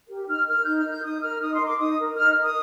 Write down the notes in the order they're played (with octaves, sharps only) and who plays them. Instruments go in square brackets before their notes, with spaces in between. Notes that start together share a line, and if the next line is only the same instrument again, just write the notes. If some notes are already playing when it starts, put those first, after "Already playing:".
[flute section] G4 A#4
D#4 F6
A#4 F6
D#4 G6
F6
A#4
G6
D#4 D#6
A#4 F6
D#4 D#6
C6
A#4
D6
D#4 D#6
A#4
D#4 F6
A#4
D#6